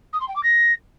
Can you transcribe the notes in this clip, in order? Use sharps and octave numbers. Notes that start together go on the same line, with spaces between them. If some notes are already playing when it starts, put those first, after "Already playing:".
D#6
C6
G5
D6
A#6